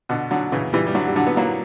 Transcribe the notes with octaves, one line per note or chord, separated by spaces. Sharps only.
B2 D3
D3 F#3
C#3 E3
E3 G3
G3
D3 F#3
G3
D3 F#3
B3
F#3 A#3